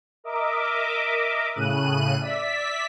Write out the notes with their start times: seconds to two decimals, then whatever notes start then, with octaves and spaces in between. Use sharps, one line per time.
0.24 A#4 D#5 E5 D6
1.55 A2 C#3 F#6 D#7
2.21 D5 E5 B6